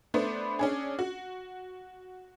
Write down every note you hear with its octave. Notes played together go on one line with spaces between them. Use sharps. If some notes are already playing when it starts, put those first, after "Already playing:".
A3 B3 D4 B4 C5
C#4 D4 G#4
F#4